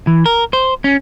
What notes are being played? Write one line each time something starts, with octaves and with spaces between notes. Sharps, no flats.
E3
A#4
C5
C#4